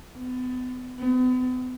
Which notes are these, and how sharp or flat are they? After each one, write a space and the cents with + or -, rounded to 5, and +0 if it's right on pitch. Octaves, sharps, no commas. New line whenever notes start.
B3 +35
B3 +40